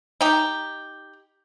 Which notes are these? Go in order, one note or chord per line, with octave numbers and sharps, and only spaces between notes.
D#4 G4